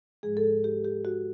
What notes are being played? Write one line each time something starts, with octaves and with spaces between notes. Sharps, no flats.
G#2 F3 G#3 G#4
A4
G#4
G4
G4
F#4